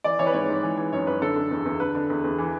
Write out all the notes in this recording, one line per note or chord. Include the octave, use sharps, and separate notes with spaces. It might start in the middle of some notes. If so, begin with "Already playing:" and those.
E3 D5
E3 C#5
B4
G#2 C#5
G#2
E3
E3
F#2 C#5
F#2 B4
D3 A4
D3
E2
E2
D3 B4
D3
E2
E2
E3